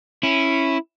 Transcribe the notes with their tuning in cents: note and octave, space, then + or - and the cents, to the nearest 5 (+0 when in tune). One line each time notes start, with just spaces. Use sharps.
C#4 -15 E4 +0